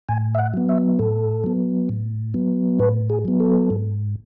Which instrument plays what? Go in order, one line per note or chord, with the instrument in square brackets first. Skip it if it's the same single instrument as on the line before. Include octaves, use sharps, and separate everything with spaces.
[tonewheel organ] A2 G#5
E5
F#5
F#3 B3
E5
A2 A4
F#3 B3
A2
F#3 B3
A2 B4
G#4
F#3 B3
A4
G#2